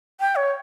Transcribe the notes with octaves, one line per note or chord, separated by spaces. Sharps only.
G5
C#5